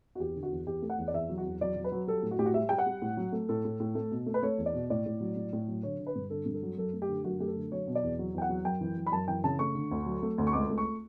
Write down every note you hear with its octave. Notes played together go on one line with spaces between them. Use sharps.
F#4
E2 G4
D3
F#4
E2
E2 G4
A3
F#5
E2
D5
E2 E5
F#3
F#4
E2
F#3 D5
F#3
B4
F#3
G3 A4
A2
F#4
A2 G4
F#4
G3 E5
G3 G5
F#5
G3
A2
F#3
A3
A2 A4
A2
A2
A3
B2
A3
B4
A3 C#5
E2
D5
B2
A2 D5
A2
F#3
A2
A2
F#3
D3 C#5
D3
B4
G2
D3 A4
G2
A4
F#3
F#2 A4
A3
G4
D3
F#2 F#4
A3 G4
A4
D3
F#3 C#5
B2
D5
E2
F#3
E2 G5
F#5
F#3
F#2 G5
E3
F#2
B5
F#2 A5
E3 G5
C#3 A5
A3 C#6
D3
D2
F#3
A3
D2
C#6
C#2 D6
A3
C#6